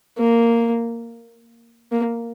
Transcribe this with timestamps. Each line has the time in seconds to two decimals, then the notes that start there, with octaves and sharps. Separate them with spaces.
0.18 A#3
1.92 A#3